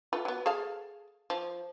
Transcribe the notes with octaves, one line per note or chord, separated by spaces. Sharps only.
A3 F4 B4
F#3 B3
G#4 A4 F5
F3